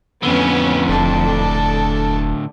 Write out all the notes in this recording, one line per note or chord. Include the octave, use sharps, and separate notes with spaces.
F2 A2 D3 B3 C#4
E1 D4 A4